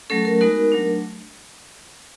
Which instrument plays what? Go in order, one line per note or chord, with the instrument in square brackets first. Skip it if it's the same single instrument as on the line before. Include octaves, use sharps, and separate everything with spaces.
[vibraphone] F#3 A3 C#4 A4
A#4
G#3 B3 D#4 F#4 A#4
F#3 A3 D4